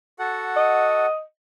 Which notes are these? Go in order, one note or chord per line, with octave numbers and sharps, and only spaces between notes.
F#4 A4 F#5
D#5